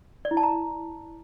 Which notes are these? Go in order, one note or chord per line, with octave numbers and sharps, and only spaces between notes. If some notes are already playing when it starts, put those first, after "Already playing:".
D5
E4
A5
A#5